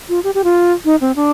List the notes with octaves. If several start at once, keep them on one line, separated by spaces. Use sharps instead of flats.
F4
G4
G4
F4
D#4
C4
D4